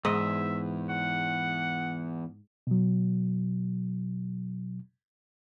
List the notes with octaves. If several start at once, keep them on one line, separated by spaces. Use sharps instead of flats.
E2 G#2 D#5 E5
F#5
B2 F#3